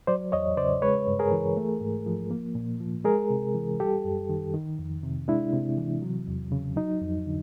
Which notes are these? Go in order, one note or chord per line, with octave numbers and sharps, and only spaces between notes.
F#3 C5 D5
E2 C#5 D#5
C#3 C5 D5
G#3 B4 C#5
G2
G#4 A#4
E3
A3
G#2
F3
A#3
A#2
F3
G#3 G#4 A#4
C3
E3
G3 G4 A4
F#2
D#3
D#3
F2
C3
G#3 D4 E4
C3
E3
F#3
E2
C#3
F#3 D#4
F2
D3